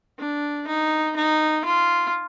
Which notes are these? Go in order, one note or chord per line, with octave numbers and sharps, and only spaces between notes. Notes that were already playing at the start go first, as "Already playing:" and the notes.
D4
D#4
D#4
F4